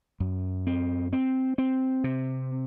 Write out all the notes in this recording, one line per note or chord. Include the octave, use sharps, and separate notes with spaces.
F#2
C4
C4
C4
C3